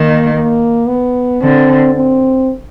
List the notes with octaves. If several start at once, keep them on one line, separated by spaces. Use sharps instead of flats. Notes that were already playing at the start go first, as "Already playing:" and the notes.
Already playing: D#3 A#3
A#3
B3
D3 C4
C4